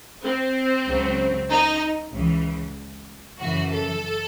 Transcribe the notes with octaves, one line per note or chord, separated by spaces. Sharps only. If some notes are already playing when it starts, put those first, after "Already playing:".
C4
C#2 C#3 F#3
D#4
C#2 C#3 E3
F#2 C#3 E3 F#4
A4